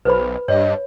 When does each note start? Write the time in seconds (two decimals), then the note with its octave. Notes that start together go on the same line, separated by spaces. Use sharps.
0.05 B1 B4 C5 B5
0.48 G2 C#5 D#5